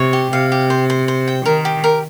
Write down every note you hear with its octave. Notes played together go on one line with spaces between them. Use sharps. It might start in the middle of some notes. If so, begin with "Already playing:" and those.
Already playing: C3 C#5
G4
C3 F5
G4
C5
C5
C5
G5
D#3 A#4
G4
A#4